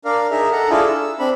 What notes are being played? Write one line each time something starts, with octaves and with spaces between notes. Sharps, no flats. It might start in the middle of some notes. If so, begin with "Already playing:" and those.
D4 A#4 D5 F5
D#4 G#4 A#4 E5
A4 F#5 A#5
D4 E4 F4 G#4 A4
E6
C4 D4 B5